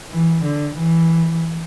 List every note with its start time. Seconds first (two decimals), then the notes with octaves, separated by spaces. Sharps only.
0.11 E3
0.44 D3
0.77 E3